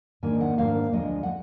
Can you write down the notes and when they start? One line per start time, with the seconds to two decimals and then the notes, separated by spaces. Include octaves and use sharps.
0.23 G#2 D#3 A#3 D4 G#5
0.41 F#5
0.58 G#2 D#3 A#3 D4 F5
0.93 D2 D3 F3 G#3 D4 D#5
1.23 F#5